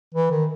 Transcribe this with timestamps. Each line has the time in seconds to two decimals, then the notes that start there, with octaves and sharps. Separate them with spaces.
0.14 E3
0.31 D#3